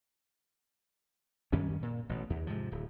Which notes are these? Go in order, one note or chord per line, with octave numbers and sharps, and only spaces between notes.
F#2 D#3 G3 C#4
A#2
A1 B2
D#2
G#2 C3 F3
D1